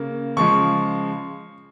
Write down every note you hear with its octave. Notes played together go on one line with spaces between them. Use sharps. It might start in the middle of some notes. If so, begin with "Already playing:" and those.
Already playing: C#3 A#3
C#3 F3 G#3 C#6